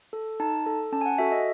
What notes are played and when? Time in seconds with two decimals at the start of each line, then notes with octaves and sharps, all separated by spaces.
0.13 A4
0.40 D#4 A5
0.66 A4
0.92 C#4 A5
1.01 G#5
1.06 F#5
1.18 F#4 A4 E5
1.32 D#5